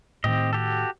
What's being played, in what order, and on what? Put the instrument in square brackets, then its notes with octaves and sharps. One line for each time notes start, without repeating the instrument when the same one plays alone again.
[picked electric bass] A2 D#3 [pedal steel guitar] C4 G4 D#5
[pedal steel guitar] F#4 G4 A4